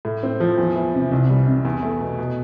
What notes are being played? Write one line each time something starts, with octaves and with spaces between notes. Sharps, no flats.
A2
C4
F3
E2
E3
C3
C2
G3
C3
E2
A3
B2
B2